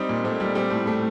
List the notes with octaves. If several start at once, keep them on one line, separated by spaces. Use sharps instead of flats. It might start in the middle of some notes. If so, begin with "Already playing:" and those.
Already playing: G3 C4 D#4
A#2
A#2 A3 C4
G3
G3 A3 C4
A2
A2 A3